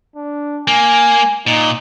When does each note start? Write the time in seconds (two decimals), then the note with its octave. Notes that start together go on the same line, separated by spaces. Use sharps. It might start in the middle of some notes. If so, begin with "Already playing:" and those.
0.16 D4
0.68 A#3 G#5
1.47 A#2 D#4